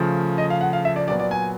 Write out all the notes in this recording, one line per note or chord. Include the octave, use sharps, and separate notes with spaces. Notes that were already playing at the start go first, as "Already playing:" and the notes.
Already playing: C#3 F3 A3
D#5
F5
F#5
F5
E5
D5
A#2 F#3 B3 D5
D5
G#5